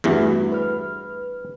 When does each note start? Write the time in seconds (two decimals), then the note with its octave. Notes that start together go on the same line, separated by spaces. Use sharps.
0.04 E2 G2 E3 A3 E4 F#4
0.52 B4 F6